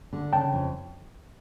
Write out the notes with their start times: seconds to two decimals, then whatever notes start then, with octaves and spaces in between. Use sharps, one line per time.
0.13 D3
0.33 C#3 G5 A5
0.53 F2